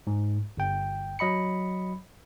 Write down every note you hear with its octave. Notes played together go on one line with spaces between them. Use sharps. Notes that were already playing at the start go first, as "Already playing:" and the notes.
G#2
G1 G5
F#3 D#5 B5 C#7